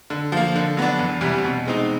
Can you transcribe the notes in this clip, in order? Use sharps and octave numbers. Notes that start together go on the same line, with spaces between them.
D3
F3 A#3
D3
F#3 B3 D4
E2
C3 E3 G3
B2
G#3 C4 D#4